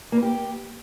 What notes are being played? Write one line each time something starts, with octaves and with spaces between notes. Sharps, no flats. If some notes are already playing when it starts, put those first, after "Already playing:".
A#3
B4
G4